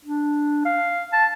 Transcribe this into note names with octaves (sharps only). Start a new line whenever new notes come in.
D4
F5
A5